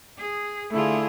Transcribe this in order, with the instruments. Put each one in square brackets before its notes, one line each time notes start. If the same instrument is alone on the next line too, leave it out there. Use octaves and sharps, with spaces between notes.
[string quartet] G#4
[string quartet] D3 F4 [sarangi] A3 [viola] E4 G#4